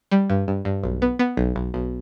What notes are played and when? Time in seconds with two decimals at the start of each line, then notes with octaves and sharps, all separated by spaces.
0.11 G3
0.30 G2
0.48 G2
0.65 G2
0.84 B1
1.02 B3
1.19 B3
1.37 B1
1.56 B1
1.74 B1